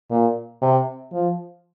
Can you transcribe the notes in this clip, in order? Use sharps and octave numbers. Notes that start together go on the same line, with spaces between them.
A#2
C3
F3